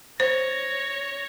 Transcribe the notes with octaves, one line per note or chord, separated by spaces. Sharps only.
C5 C#5 A#6